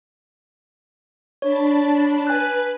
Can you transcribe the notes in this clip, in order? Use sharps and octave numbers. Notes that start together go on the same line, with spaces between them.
D4 C#5 A5 B5
B4 G#5 F#6